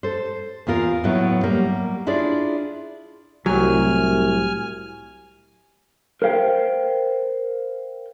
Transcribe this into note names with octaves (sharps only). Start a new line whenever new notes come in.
A4 C5
E2 B3 F4 A#4
A2 F#3 B3 E4
F#3 G3 A#3 A#4
D4 E4 F4 G#4 D5
C2 A2 F#3 G#5 F6
A#4 C5 F5 G5